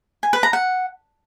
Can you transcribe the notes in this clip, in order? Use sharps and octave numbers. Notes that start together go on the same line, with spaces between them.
G#5
B4
A#5
F#5